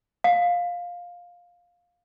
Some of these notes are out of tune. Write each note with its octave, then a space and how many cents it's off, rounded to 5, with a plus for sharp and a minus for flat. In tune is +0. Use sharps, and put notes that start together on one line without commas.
F5 +10